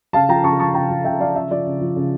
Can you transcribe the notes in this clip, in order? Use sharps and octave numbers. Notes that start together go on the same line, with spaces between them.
C#3 F5 A5
F3 G5 A#5
C#3 A5 C#6
F3 A5 C#6
C#3 G5 A#5
F3
C#3 E5 G5
F3 D5 F5
C#3 E5
F3 D5
C#3
F3
C#3